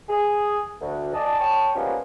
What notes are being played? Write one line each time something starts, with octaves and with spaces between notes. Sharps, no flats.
G#4
D2
D5 D#5 G#5 A5
C#5 G5 A5
F3 G3 G#3 A#3 B3 C#4